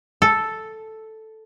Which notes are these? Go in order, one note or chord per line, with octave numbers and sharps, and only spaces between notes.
A4